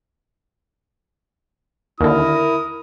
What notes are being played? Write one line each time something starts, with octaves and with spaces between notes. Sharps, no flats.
D#2 D3 E4 A#4 D#6